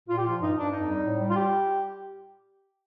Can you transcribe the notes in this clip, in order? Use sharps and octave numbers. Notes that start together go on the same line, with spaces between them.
A#2 F4
G4
F3 F4
G2 D#4
G2 D4
F2 D#4
G3
A2
G3
F4
G4